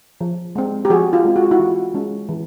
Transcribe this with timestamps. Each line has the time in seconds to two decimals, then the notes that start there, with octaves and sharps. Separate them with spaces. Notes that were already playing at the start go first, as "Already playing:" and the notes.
0.21 F3
0.55 G#3 C4
0.85 G4
0.90 F3 F#4 G#4
1.13 F4 G4
1.25 G#3 C4
1.36 F#4
1.44 F4
1.51 E4 F#4
1.59 E3
1.94 G#3 C#4
2.29 E3